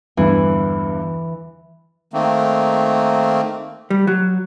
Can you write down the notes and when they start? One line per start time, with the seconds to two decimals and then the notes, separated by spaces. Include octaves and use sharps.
0.17 E2 G2 D3 E3
2.13 D#3 A3 A#3 C4
3.90 G3
4.07 F#3